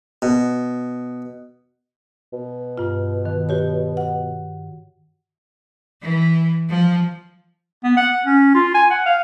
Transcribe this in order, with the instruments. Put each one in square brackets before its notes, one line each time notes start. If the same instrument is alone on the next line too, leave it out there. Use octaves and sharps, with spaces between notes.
[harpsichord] B2
[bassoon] B2
[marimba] G2 F4
D#3
F#4 G4 C#5
F#5
[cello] E3
F3
[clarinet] B3
F#5
C#4
F4
G#5
F#5
F5